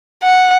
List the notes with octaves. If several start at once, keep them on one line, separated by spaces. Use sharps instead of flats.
F#5